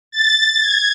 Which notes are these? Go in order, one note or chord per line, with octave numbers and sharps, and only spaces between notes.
A6
G#6